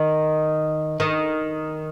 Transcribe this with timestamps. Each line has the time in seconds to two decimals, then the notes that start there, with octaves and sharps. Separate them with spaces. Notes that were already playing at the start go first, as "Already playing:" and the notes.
Already playing: D#3
1.00 D#3